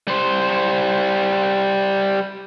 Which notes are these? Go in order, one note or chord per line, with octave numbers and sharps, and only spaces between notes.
G3 C5